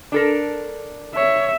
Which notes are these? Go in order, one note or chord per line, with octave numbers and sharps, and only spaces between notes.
D4 A4 A#4
C#5 E5